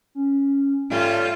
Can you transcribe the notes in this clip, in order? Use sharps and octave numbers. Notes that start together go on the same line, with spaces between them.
C#4
G#2 G3 A3 C#4 F4